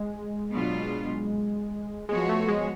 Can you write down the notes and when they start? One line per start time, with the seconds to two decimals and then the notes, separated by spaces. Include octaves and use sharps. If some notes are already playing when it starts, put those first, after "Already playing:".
Already playing: G#3
0.53 B2 F#3 B3 D4 F4
2.09 F3 G#3 B3 F#4 C#5
2.29 A3
2.48 G#3